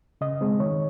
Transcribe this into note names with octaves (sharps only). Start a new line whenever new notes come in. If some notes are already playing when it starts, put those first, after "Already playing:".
C#3 D#5
G#3 C4
D#3 C#5